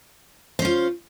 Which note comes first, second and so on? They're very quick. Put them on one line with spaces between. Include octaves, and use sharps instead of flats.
C5 C#4 F4